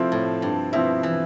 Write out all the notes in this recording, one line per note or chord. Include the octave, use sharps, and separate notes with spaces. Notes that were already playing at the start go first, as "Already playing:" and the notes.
Already playing: F3 A3 C4 E4
A2
G2
B2 F3 C4 E4
E3